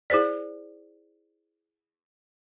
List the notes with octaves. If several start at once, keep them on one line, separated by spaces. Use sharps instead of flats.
E4 G#4 C5 D5